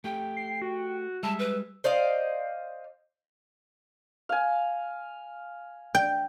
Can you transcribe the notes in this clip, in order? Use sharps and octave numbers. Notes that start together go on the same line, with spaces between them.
A3 G4 G5
C7
F#4
G3 G#3 E5 A5
B4
C5 D5 D#5 F5
F5 G#5
G5